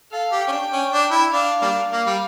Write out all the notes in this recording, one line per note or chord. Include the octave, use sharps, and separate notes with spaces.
A4 F5
G4
G5
C#4
D4
C#4
D4
E4
D4 F5
G3 A#3 D4
A#3 F5
G3